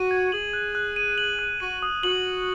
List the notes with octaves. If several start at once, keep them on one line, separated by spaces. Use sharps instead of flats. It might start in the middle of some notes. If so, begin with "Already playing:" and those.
Already playing: F#4 D#7
G#6
G#4 F#7
F#6
F#6
D#7
F#7
F#6
F#4 D#7
D#6
F#4 F#7